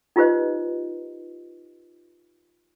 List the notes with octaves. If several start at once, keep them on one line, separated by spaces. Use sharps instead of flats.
D#4 F4 G4 B4 C5 D#5